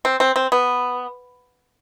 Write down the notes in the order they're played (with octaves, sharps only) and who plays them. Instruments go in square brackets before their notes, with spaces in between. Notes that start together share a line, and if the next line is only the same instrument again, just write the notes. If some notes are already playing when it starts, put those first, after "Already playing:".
[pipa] C4
C4
C4
B3